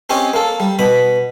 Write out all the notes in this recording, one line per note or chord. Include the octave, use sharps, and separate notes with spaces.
C4 C#4 G4 D#5 G#5
A#3 A4
G3
B2 B5 D#6